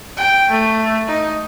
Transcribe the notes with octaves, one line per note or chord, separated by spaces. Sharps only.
G5
A3
D#4